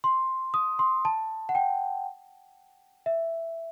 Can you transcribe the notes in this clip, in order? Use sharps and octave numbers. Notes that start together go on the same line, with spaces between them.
C6
D#6
C6
A5
F#5
G5
E5